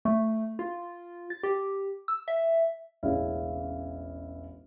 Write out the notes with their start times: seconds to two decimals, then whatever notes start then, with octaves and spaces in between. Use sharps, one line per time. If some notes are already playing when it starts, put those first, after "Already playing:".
0.05 A3
0.59 F4
1.30 A6
1.43 G4
2.08 E6
2.28 E5
3.03 E1 A1 C#3 C#4 E4 F5